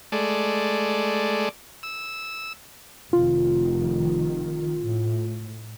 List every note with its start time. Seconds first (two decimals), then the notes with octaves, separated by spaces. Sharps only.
0.12 G#3 A3 D5
1.83 E6
3.13 F1 D#3 F4
4.82 A2